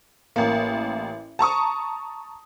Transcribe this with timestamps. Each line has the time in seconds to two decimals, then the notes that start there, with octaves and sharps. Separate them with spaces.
0.36 A1 A#3
1.39 A5 A#5 C#6 D#6